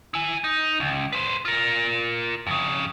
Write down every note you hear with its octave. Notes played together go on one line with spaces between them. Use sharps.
E4 G#5
D#4
C#2
B4 C5
F4 A#4
F2 C#3